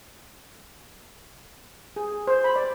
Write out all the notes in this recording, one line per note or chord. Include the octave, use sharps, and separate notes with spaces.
G#4
C5
B5
D5